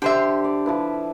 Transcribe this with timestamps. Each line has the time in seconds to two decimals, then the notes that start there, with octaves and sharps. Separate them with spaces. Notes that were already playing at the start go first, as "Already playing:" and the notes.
0.02 D3 G4 C5 E5
0.44 D5
0.66 F3 E4 B4